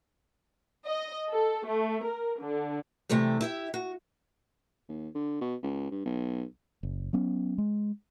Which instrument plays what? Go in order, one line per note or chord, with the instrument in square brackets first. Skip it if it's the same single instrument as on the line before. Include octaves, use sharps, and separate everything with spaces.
[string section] D#5
A4
A3
A#4
D3
[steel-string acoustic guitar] C3 E3 G3 A3 G4
E4 G4 E5
F#4
[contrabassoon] D#2
D3
B2
C#2
G2
B1
[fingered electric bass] F#1
F#3 B3 C#4
G#3